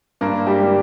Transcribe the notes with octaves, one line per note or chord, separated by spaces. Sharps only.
G2 A#3 A#4
G3 G4
G3 A#3